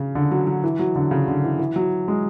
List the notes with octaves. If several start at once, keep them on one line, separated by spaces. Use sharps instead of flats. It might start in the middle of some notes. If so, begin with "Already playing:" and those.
Already playing: C#3
D3
F#3
F#3
E3
F#3
D3
C#3
D3
E3
E3
F#3
G#3